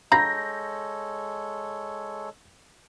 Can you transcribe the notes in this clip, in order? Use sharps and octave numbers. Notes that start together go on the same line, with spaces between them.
G#3 A4 C#5 F5 A#5 B5 G6 A#6